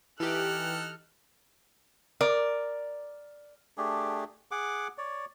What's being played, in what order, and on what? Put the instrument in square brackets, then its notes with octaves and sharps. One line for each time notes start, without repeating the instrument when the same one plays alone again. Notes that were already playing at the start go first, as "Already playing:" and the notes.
[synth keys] E3 G4 [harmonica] D#4 A4 F6 [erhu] F#6
[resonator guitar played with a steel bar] A#4 D5
[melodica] A3 D4 G4 G#4
G#4 F#5 D6
C#5 D5